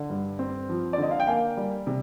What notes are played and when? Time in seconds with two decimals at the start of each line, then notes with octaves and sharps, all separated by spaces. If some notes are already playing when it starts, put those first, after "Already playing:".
Already playing: D3
0.10 G2
0.39 C4
0.69 F3
0.93 D5
0.98 D3 D#5
1.11 F5
1.20 G5
1.27 A#3 F5 G#5
1.57 G3
1.87 C3